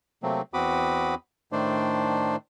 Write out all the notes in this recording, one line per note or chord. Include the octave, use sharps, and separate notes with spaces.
C3 F#3 A3 A#3 C4
E2 C4 F#4 B5 D6 D#6
A2 D#3 A3 D4 C5 D5